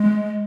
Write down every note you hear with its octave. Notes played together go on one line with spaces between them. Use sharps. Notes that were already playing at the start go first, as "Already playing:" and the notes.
Already playing: G#3